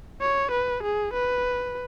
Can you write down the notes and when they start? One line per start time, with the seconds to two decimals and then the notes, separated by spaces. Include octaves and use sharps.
0.21 C#5
0.51 B4
0.83 G#4
1.13 B4